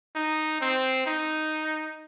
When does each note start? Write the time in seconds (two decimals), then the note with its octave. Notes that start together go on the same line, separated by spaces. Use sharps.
0.16 D#4
0.61 C4
1.06 D#4